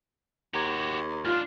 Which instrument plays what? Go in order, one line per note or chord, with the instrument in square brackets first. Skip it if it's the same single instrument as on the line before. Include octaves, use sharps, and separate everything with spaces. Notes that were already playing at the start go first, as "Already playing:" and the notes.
[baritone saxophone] D#2 [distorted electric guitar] F#4 G4 [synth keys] A#5 G#6
[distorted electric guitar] G#2 D4 [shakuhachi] F4 [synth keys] F6